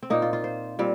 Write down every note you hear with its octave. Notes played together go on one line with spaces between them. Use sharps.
C4
A#2 A#3 D#4
F4
F4
C5
A#2 G3 C4